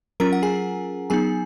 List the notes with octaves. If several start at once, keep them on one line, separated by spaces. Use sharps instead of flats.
F#3 C#4 F4 A#4 A#5
F#5
G#4 G#5
F#3 B3 D#4 G#4 G#5